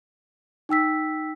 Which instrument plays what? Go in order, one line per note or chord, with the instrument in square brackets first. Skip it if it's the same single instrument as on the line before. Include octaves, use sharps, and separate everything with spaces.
[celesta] D#4 G5 E6 B6